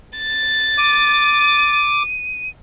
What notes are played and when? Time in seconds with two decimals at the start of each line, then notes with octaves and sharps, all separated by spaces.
0.19 A6
0.78 D6 D#7